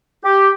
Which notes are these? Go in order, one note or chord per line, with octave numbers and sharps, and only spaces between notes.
G4